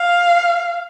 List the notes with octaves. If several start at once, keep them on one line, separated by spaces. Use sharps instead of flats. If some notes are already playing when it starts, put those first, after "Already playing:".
Already playing: F5